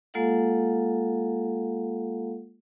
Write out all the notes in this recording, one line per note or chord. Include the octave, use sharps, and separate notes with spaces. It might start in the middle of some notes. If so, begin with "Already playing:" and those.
G#3 A#3 F4 A4 F5 F#5